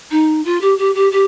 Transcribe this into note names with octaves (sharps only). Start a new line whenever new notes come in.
D#4
F4
G4
G4
G4
G4